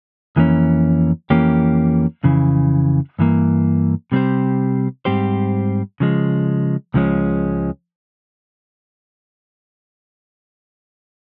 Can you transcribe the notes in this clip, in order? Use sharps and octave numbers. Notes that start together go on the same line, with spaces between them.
F2 E3 A#3 C#4
F2 E3 A#3 C#4 G4
F2 C#3 E3
G2 E3 A#3
C3 G3 C4 G4 C5
G#2 G3 C4 G4 C5
C#3 F3 G#3
C#2 C#3 F3 G#3 C#4